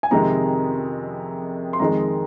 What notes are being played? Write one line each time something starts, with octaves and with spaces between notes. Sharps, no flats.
G#5
F2 C3 D#3 G#3 A#5
C6
F2 D#3 G#3 A#5